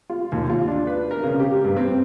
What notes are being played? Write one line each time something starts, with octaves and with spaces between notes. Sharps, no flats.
F4
D#2
F4
D4
B4
A#4
C#3
G4
G2
C4